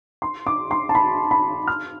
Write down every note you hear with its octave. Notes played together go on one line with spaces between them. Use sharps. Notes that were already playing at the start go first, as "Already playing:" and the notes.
C6
D6
C6
A5
B5
B5
F6